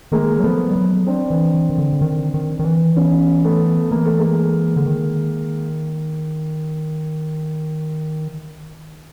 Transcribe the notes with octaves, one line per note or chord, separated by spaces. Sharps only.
D#3 G#3 A#3
F#3
F3 A3 B3
G3
F#3
C4 D4
E3
E3
D#3
D3
D3
D#3
D#3
D#3
E3
B3 C#4
A3 B3
E3 A#3
A3
G#3 A#3
D3
D#3